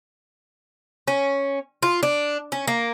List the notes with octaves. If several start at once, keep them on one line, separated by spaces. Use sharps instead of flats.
C#4
F4
D4
C#4
A#3